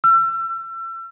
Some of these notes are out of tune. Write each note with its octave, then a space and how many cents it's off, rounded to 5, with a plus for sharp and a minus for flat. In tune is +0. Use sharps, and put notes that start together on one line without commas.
E6 +35